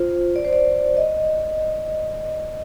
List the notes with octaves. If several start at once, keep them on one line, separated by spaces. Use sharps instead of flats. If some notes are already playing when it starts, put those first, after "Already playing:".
Already playing: F4 C5
D5
C5
D5
D#5